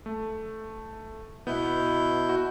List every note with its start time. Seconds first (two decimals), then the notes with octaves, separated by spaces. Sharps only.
0.06 A3
1.47 B2 B3 E4 G6
2.29 F#4